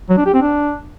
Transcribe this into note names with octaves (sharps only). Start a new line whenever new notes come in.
F#3
D4
G4
C4
D4